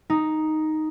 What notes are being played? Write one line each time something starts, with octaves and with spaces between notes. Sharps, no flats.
D#4